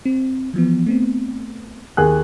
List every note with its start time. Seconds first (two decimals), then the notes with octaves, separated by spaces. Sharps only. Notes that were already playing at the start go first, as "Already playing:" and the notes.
0.05 C4
0.54 E3 F3 B3
0.86 A3 B3 C4
1.97 D#2 G#4 F#6